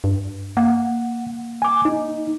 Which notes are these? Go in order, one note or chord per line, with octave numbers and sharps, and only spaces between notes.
G2
A#3 F#5
G#5 D6
D#4